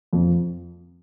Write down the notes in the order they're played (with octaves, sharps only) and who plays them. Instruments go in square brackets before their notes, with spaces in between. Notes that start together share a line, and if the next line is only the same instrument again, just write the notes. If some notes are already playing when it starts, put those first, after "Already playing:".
[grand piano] F2